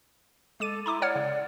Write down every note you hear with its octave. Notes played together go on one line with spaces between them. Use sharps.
G#3 A4 D6 D#7
E4 A#5 C6 D6
C#5 D5 F#5 F6
C#3